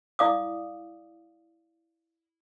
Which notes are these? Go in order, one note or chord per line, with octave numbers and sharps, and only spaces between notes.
E4 D5 F5 D6 D#6